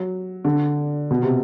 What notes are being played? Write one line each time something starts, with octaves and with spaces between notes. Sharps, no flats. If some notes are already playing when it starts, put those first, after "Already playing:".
Already playing: F#3
D3
B2
C3